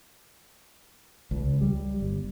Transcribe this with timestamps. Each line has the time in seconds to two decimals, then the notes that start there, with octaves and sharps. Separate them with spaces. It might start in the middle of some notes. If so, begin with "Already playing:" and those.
1.31 C#2
1.61 G3
2.00 G1